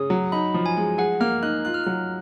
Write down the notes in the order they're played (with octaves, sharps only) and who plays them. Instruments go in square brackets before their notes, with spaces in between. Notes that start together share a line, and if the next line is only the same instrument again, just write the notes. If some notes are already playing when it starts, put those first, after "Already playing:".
Already playing: [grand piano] C#3 C#4 [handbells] D#6
[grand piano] F#3
[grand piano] D#4 [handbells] B5
[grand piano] F3
[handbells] G#5
[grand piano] G#3
[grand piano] G#4 [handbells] F#5
[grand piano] A#3 [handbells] F6
[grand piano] D#4 [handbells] F#6
[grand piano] F4 [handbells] F#6
[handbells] F6
[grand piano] F#3 [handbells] F#6